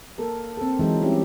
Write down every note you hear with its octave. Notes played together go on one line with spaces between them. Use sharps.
A#3 A4 A#4
C4 A4
E3 F#3 G#3 D#4 E4
G3 C4 C#4 E4 G4